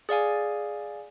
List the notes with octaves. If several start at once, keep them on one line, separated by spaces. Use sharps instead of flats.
G#4 D5 F5 G#5